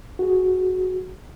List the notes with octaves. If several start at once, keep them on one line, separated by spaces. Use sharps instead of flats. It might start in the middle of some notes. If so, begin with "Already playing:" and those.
F#4 G#4